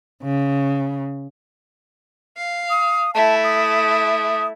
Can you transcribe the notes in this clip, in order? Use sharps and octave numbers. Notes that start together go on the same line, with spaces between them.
C#3
F5
D#6
A3 E4 A5
D#6